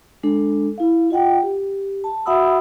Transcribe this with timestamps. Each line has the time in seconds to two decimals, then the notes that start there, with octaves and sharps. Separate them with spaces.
0.23 G#3 D4 A4
0.78 E4 F5
1.10 F4 D#5 F#5 G5
1.43 G4
2.04 A5
2.26 F#4 E5 F#5 B5 D#6 E6